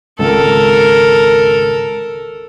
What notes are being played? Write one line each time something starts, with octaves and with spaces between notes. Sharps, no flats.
G#1 C#2 A4 A#4